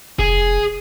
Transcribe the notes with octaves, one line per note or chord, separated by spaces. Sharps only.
F1 G#4